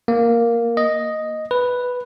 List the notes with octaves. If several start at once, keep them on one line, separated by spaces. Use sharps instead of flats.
A#3
D#5
B4